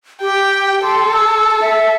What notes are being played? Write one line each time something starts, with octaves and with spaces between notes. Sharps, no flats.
G4 G5
A4 C6
E6
E5